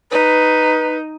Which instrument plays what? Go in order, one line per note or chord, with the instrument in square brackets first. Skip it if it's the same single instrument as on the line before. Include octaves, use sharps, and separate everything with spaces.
[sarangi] D#4 [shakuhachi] B4